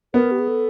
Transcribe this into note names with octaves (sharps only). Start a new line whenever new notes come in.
B3 A#4
G4
G#4
A4